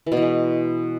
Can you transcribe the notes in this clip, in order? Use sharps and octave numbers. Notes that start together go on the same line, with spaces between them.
E3
B2
E3
G#3